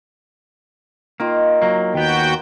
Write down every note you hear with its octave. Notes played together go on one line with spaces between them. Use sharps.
D#3 A#3 F4
F#3 A#3
D#2 B3 F#4 G5